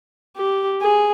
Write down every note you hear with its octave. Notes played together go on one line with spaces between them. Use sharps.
G4
G#4